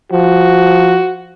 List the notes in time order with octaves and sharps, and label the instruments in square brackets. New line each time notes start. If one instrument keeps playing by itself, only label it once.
[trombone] F3 [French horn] F#4